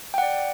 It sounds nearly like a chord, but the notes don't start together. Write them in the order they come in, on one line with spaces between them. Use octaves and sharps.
G5 F#5 D5